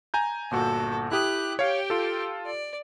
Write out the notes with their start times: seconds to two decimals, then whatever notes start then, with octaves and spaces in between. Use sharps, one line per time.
0.14 G#5 A#5 G6
0.51 G1 A#2 F#4 A4
1.12 E4 G4 D#6 F#6
1.59 G4 C#5 F5 G5
1.90 F4 A4
2.46 D5